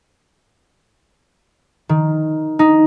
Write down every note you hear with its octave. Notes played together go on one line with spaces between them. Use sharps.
D#3
D#4